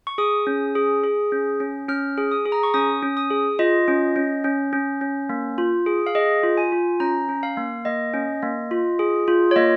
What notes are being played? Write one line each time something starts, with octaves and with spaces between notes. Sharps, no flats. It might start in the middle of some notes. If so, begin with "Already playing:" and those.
C#6
G#4 D#6
C#4
G#4
G#4
C#4
C#4
C#4 F6
G#4
D#6
G#4
A#5
C#6
C#4 D#6
C#4
D#6
G#4
F4 D#5
C#4
C#4
C#4
C#4
C#4
A#3
F4
G#4
F5
G#4 D#5
F4
G#5
F4
C#4 A#5
C#4
F5
A#3
A#3 D#5
C#4
A#3
F4
G#4
F4
C#5
A#3 D#5